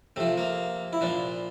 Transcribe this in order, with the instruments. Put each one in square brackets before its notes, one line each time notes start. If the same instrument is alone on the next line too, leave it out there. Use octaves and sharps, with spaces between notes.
[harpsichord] C3 F3 A3
A#3
E4
A#2 F3 D4